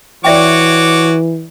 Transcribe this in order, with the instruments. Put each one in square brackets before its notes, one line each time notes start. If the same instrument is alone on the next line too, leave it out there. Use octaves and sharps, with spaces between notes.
[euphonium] E3 [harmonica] F#4 C#5 D6 [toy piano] D5 E5 G5